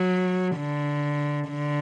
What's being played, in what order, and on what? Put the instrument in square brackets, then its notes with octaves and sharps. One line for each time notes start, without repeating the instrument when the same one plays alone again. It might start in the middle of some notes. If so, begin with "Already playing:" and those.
Already playing: [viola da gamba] F#3
D3
D3